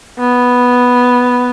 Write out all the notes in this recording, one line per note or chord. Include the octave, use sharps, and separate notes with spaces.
B3